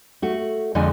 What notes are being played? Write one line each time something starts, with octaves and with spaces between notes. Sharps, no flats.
A3 F#4
F2 D3 F3 G#3 D4 G#5